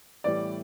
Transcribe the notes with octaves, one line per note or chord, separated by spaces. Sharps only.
A2 E3 G3 B3 D5